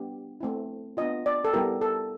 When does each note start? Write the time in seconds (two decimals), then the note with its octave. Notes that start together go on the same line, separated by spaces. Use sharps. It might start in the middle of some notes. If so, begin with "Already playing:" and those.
Already playing: G3 B3 D4 G4
0.41 A3 C4 E4
0.97 B3 D4 F4 D#5
1.26 D5
1.45 A4
1.53 G3 B3 E4 G4 A#4
1.81 A4